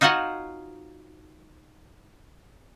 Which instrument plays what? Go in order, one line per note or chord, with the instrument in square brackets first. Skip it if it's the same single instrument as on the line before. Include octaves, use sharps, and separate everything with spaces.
[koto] D#4 F4 F#4 C5 F#5 G#5